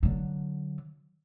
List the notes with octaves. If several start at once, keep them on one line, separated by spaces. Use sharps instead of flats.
D3 F#3